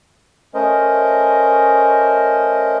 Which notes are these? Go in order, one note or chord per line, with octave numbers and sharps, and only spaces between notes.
A3 C#4 A#4 C5 D#5